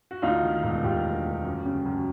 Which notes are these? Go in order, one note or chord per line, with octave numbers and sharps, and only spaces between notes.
F#4
D2 D#4 F4
D#3
E1
E1 F4 G4
D2
D2
F#2
C#3
F#2